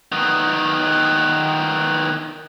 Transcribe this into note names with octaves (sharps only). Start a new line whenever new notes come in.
D#3 B3